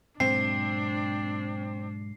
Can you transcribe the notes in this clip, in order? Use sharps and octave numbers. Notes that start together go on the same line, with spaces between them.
G#2 B2 F#3 C4 D4 C7